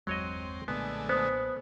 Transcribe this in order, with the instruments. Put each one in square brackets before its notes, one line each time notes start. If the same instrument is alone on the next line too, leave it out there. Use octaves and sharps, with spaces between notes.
[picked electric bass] G1 E2 G#3 [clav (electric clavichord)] F#3 C#5 D#5 [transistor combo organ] C4
[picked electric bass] B1 A#2 [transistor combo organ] D3 G#3 A3 [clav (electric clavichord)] B3
[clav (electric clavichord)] B3 [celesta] C5 D#6